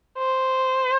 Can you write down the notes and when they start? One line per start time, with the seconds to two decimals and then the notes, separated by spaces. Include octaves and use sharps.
0.18 C5